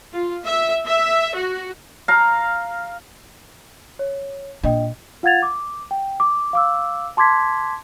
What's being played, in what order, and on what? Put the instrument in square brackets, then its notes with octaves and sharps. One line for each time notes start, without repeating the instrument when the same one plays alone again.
[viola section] F4
E5
E5
F#4
[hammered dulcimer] F5 A#5
[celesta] C#5
[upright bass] A#2 [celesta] D4 D#5 G5
[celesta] F4 F5 F#5 G#6 A6 F7
D6
G5
D6
F5 D6 E6
A5 C6 D6 G#6 B6